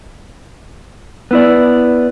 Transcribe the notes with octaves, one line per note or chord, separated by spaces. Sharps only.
B3 E4 D5